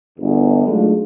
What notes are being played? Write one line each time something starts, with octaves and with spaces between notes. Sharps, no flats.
G1 E2
F#3 G#3 A3 D4 D#4 F4